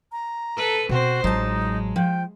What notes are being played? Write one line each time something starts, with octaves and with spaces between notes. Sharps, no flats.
A#5
A4 B4
B2 C4 F#4 C5
A1 F#3 G#3 D#4 F4 A5
F3 G5